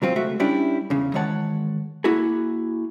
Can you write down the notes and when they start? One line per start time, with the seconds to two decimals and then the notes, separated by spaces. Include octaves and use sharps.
0.02 C2 F#3 C4 F4
0.16 C#2 A3 F#4 E5
0.40 G3 C#4 D4 E4 G4
0.90 E2 C#3
1.14 D#3 E3 G#3 C#5 F#5 A5
2.04 A#3 E4 F#4 G#4